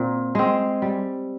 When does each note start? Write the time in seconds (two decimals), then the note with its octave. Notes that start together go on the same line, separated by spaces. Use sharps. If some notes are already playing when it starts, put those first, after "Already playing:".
Already playing: A#2 C4
0.35 G#3 C4
0.82 G3